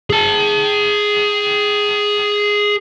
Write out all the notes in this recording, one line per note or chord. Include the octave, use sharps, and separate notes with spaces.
G#4 A5